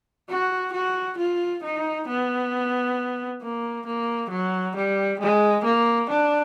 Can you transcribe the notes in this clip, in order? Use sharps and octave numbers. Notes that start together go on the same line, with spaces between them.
F#4
F#4
F4
D#4
B3
A#3
A#3
F#3
G3
G#3
A#3
D4